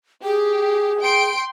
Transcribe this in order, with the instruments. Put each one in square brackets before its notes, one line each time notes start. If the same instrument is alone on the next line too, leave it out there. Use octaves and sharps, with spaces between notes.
[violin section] G4 [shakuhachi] G#4
[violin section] G5 C6 D7